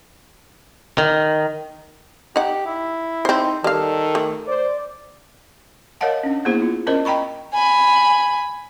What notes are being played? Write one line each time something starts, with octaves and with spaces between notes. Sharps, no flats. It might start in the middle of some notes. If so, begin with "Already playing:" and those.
D#3
D#4 G4 F#5
E4
C4 D#4 C5
D#3 G3 A4 F5
A3
C5 D5
A#4 C#5 D#5 F5 F#5 A5
C#4 D4
A#3 B3 D4 E4 G#4 C5
F4
C#4 A#4 C5 D5 D#5
D#5 G5 A#5 B5 C#6
G#5 B5